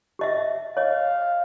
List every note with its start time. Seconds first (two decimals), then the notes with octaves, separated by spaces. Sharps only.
0.19 G4 D#5 E5
0.77 C#5 D#5 F5